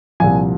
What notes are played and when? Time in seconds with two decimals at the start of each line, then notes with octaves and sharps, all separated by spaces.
0.20 C2 A#2 F3 G#5